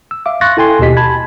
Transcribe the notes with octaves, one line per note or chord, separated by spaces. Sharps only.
E6
E5 F5 D6
F5 C6 C#6 F#6 A6 A#6
E4 A4 G5 G#5 C6
D#2 B2 G4 D#5 B6
A5 B5 G#6